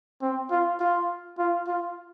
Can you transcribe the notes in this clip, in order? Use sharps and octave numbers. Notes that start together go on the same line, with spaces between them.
C4
F4
F4
F4
F4